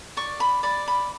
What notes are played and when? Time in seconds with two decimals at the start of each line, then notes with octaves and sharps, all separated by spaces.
0.17 D5 C#6
0.40 B5
0.63 D5 B5
0.88 B5